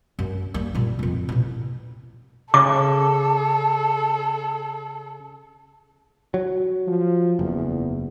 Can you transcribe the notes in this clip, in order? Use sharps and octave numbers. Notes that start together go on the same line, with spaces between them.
F#2
G3 A#3
A#2 G3
F2 A#2
A1 B2
C#3 A4 D6
F#3
F3
F#1 E2